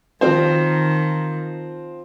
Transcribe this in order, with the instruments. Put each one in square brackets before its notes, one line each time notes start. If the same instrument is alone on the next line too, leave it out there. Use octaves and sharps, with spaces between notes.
[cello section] D#3 [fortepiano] F3 C4 C5